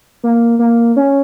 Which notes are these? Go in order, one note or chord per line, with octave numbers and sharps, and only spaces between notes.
A#3
A#3
C#4